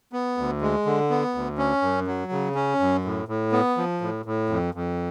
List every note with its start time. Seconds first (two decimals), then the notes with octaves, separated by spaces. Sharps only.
0.13 B3
0.37 D2
0.61 G#3
0.86 D3
1.10 B3
1.35 D2
1.58 C#4
1.82 F#2
2.07 F#3
2.32 C#3
2.55 C#4
2.80 F#2
3.05 A2
3.28 A2
3.52 B3
3.77 F3
4.01 A2
4.25 A2
4.49 F2
4.74 F2